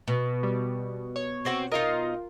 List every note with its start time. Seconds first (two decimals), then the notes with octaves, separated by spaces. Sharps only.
0.08 B2
0.43 G3
1.16 C#5
1.45 C4 F#4 C5
1.72 D#4 F4 A#4 D#5